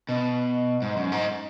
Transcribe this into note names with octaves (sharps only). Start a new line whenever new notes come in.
B2
G#2
F#2
G#2